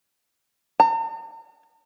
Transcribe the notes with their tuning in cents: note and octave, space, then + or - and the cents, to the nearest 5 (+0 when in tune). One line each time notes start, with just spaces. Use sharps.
A#5 -45